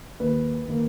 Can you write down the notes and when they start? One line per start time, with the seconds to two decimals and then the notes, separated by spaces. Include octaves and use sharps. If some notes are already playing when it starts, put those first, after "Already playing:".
0.19 D#2 D#3 A#3 B4
0.68 D#3 A#3